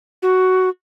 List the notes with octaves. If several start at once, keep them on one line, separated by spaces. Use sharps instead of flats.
F#4